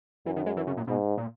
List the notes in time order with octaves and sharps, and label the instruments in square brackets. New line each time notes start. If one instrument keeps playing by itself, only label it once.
[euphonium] F#2 [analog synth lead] E3
[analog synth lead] D#3
G#3
E3
C#3
A#2
[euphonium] G#2 [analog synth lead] B2
[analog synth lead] A#2